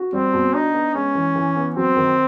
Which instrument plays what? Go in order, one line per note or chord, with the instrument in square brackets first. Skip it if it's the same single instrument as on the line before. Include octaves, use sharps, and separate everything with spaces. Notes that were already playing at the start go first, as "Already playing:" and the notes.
Already playing: [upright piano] F#4
[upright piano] G3 [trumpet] C4
[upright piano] B2
[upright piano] D4 [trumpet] D#4
[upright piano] B3
[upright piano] G#3 [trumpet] C#4
[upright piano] E3
E3
B3
[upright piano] F#3 [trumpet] C4
[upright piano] D#3